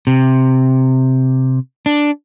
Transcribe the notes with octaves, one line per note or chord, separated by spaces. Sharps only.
C3
D4